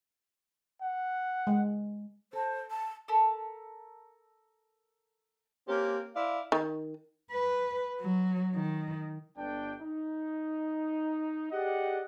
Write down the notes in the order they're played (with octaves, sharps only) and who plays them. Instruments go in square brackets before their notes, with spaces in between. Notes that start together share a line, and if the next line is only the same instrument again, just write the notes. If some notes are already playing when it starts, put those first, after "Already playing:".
[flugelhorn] F#5
[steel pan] G#3
[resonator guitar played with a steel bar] A4 [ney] C5
[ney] A5
[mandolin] A4 A#4 A5 B5
[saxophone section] A#3 C4 C#4 G4
E4 C5 D5 F5
[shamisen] D#3
[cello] B4
F#3
D#3
[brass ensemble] G1 D4 G5
D#4
G4 G#4 D5 D#5 F#5